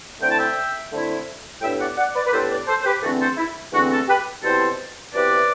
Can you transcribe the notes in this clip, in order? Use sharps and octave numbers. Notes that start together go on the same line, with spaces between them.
D3 A3 C4 E4 G5
A5
E5 G5
D3 A3 C4 E4
A2 G3 B3 D4 E5 G5
D5 F#5
D5 F#5
B4 D5
B4
A2 G3 B3 D4 A4 C5
B4 D5
A4 C5
C5
G4 B4
E2 D3 A3 C4 F#4 A4
A4 C5
E4
E2 D3 A3 C4 F#4
F#4 A4
G4 B4
B2 G3 C4 E4 A4 C5
B2 G3 C4 E4 B4 D5